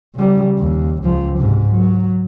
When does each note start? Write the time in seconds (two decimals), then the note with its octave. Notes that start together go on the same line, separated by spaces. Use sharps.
0.15 C#3 G3
0.58 D#2
1.03 C#2 F3
1.39 G#2 C3
1.71 F#3